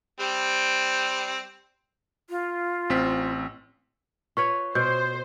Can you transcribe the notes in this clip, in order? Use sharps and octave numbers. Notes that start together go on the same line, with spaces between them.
G3 C4
F4
A1 C4 B6
F4 B4 C#5 C#6
B2 C5 G6